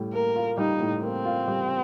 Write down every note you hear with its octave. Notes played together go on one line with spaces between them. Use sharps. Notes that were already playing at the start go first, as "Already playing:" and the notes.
Already playing: A2 G3
A#3 A#4
F4
G3 D#4
A2
A#3 C4
F4
G3